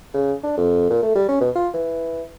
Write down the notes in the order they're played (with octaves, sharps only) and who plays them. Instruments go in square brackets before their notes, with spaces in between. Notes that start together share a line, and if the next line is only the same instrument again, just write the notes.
[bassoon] C#3
D4
F2
A#2
A3
G3
C#4
B2
F4
E3